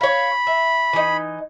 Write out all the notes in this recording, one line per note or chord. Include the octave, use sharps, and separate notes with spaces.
C#5 F5 B5
E5
E3 D#4